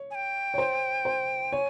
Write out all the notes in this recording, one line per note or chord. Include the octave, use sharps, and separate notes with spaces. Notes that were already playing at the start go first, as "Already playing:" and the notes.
Already playing: C#5
G#5
G5
C#5
C5
C5
C#5 G#5